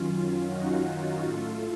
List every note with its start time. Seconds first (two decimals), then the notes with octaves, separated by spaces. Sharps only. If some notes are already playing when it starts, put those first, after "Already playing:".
Already playing: F#2 D#3 F#3 C#4 F4
0.47 D#4 F#4
1.21 A2 A3 F4 A4